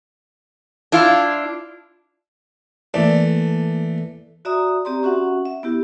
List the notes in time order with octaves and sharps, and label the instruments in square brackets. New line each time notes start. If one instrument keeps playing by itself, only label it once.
[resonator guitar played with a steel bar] D4 E4 F4
[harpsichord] E3 A3 [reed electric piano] A#3 A4 [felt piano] D5
[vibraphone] F#4 D5 E5 A#5 D#6
C4 G4 D5 A#5 C6
C#4 F#4 E5 F#5
E5
B3 E4 G4